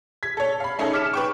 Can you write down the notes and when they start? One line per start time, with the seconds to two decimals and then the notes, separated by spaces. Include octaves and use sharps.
0.23 G#6 B6
0.37 A4 C#5
0.60 F5 B5
0.79 A3 C#4 D#4 G#4 A4
0.93 D6 F6 B6 C#7 E7
1.14 B4 G5 C#6